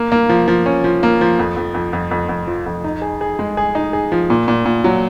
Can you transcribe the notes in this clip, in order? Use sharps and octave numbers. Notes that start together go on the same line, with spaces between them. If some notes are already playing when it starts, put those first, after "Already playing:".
Already playing: A#3
A#3
F3
F3
C#4
F3
A#3
F3
F2
F2
F2
F2
F2
F2
F3
F2
D#4
G#4
G#4
G#3
G#4
D#4
G#4
F3
A#2
A#2
A#2
F#3